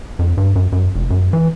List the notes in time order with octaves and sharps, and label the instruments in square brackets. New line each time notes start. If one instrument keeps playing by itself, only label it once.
[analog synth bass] F2
G2
F#2
F#2
F1
F#2
E3